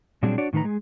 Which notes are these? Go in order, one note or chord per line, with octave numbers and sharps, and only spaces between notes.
A#2 F#3 G3 C4 D4 G#4
D4 F#4 C#5 D5
A2 D#3 D#4 B4 A#5
G#3 G#4